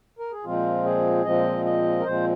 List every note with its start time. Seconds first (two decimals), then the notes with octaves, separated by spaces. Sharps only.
0.19 A#4
0.32 G#4
0.44 A#2 F3 G#3 C4 F4
0.84 G#4
1.25 A#2 F3 G#3 C4 D#5
1.65 D#5
2.00 A#4
2.04 A#2 F3 G#3 C4 C5